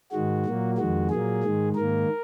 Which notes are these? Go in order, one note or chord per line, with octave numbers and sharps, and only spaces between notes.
G#2 D#3 G#3 F#4
A#2 F#3 A#3
F2 D#3 G#3 F#4
A#2 F#3 A#3 G#4
G#2 D#3 G#3
G#2 D#3 A#3 A#4